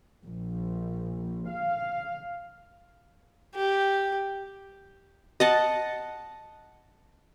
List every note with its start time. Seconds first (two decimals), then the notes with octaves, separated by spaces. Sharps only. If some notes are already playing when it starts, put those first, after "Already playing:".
0.24 A#1
1.49 F5
3.55 G4
5.40 D#5 F#5 A5